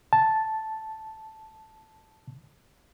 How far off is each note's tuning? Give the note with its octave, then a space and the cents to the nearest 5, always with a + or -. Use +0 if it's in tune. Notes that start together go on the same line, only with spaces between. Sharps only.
A5 -5